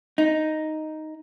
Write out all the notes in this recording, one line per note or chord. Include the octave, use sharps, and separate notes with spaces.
D#4